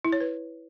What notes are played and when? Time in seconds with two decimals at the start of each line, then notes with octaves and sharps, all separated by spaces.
0.05 E4
0.12 C#5
0.20 B4